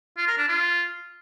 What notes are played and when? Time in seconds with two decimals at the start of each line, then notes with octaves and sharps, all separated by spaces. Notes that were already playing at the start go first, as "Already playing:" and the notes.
0.17 F4
0.28 A#4
0.38 D4
0.48 F4